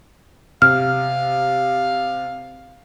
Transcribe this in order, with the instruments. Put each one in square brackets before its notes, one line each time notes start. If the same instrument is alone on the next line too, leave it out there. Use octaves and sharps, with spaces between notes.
[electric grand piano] C3 [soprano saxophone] F5 [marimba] F6